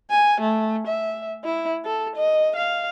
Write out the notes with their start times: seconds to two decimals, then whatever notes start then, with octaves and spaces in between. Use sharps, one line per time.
0.10 G#5
0.41 A3
0.87 E5
1.44 E4
1.85 A4
2.16 D#5
2.56 F5